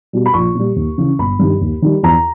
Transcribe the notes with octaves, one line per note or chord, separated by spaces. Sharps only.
B2 G3
B5
A#1 C#6
A#2 G3
D#2
C#3 E3
G1 B5
G2 D#3 G3
D#2
D#3 G3
E2 A#5